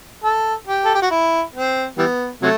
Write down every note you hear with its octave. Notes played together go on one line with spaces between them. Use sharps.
A4
G4
A4
G4
F#4
E4
C4
E3 G3 B3
C3 F#3 A3